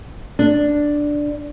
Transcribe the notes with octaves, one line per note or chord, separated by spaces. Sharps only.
D4